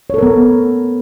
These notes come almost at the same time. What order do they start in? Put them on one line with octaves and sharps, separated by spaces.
C#5 A4 A#4 B3